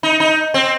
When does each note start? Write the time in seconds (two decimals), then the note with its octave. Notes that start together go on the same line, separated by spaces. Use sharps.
0.03 D#4
0.20 D#4
0.54 C4